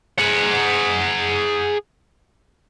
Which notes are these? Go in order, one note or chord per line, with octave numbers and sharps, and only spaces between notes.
G#4 F#5